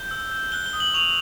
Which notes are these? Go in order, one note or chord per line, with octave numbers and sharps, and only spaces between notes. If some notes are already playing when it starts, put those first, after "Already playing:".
Already playing: G6 G7
E6
G6
F#6 G7
G7
D#6
F#7
C#6 F7